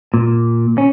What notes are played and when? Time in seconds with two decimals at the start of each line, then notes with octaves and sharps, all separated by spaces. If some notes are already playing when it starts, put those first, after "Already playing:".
0.14 A#2
0.78 C#4